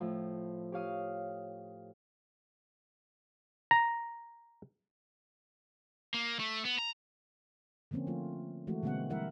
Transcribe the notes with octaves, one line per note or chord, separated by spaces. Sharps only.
A2 F3
G4 C#5 F5 D#6
A#5
A#3
A3
B3
A#5
D3 F3 A#3 C4 C#4
F3 A3 F4
E3 G#3 A3 F#4
B2 D3 G#3 A#3 C4 F#5
E3 G3 E4 A#4 E5 F#5